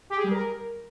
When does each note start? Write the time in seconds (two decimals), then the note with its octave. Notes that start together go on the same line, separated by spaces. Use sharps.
0.10 G4
0.17 G#4
0.24 G3
0.31 A#4